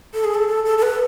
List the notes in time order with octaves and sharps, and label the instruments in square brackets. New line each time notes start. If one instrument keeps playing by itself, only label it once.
[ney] A4
G#4
A4
A4
A4
A4
B4